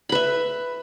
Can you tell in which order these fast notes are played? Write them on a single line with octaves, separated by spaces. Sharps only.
B5 B4 E5